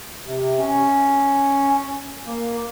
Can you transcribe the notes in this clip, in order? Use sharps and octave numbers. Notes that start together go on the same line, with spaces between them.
C3
C#4
A#3